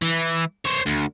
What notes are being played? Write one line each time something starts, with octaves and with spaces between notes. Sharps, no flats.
E3
C5 C#5
D2